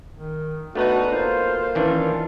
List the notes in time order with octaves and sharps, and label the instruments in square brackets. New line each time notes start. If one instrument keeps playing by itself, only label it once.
[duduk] D#3
[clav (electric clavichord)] A3 B3 B4 [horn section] D4 D#4 [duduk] F#4
[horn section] A#3 F4 [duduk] C5
[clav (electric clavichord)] D#3 E3 D4 [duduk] C#4